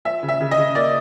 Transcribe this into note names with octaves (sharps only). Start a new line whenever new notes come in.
F3 E5
C#3
E5
C#3
D#5
C#3
A#3 D5